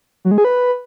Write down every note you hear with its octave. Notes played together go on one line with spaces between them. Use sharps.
F#3
G#3
G#4
B4